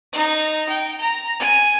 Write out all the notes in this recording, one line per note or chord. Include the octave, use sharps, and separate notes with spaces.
D#4
G5
A#5
G#5